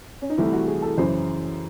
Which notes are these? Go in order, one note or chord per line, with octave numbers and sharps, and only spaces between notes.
C#4
D#4
C2 C3 E3 A3 E4
F#4
G#4
A4
F#2 C#3 E3 C5